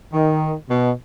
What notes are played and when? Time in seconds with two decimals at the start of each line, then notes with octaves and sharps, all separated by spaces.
0.12 D#3
0.70 B2